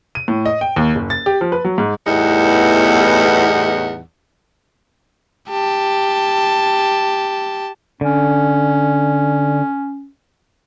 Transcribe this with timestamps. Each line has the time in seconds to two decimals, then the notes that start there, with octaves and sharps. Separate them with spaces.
0.15 D#7
0.28 A2
0.46 D#5
0.61 G5
0.76 D#2
0.95 F#1
1.10 A6
1.26 G4
1.41 F3
1.52 B4
1.65 F#3
1.78 G#2
2.06 E2 A2 G3 B3 D#4 F#5
5.50 G4 A5
8.01 D3 C#4